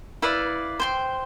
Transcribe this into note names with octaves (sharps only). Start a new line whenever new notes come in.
E4 B4 D5 F5
C5 G5 C6